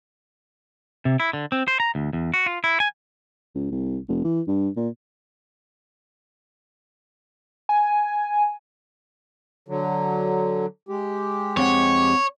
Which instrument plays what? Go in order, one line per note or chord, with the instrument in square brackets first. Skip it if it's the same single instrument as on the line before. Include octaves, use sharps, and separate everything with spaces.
[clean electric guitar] C3
E4
D3
C4
C5
A#5
D2
E2
F#4
F4
E4
G#5
[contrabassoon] C#2
C2
F1
E3
G2
A#2
[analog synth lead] G#5
[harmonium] D3 F#3
G#3 G4
[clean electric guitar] F2 C4 F#5 [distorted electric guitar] C#5